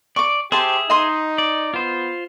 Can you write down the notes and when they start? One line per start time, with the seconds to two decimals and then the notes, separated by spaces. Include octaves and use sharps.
0.16 D5 C#6 D6
0.52 G4 G#4 C5 E5 A5 C6
0.90 D#4 D#5 C6 D#6
1.38 D5
1.74 B3 F4 C5